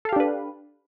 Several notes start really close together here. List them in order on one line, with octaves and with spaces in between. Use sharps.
A4 F5 G4 D4 B4